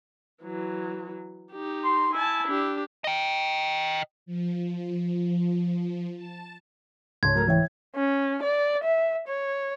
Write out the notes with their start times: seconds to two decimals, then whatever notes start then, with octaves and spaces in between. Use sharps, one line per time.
0.43 E3 F#3
1.52 D#4 G4
1.84 C6
2.13 E4 G#5 A5
2.47 D4 G4
3.04 D#5 G5
4.26 F3
6.16 A5
7.23 C#2 G#2 C#5 A5 C6 G#6
7.35 F#3 A3 A#4
7.47 E3 C#5 E5 G5
7.96 C#4
8.43 D5
8.83 E5
9.28 C#5